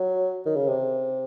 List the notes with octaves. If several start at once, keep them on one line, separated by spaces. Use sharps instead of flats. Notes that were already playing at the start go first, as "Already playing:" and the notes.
Already playing: F#3
D#3
C#3
C3